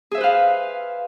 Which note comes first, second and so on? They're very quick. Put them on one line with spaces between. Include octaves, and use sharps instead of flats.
G#4 E5 C5 B4 F5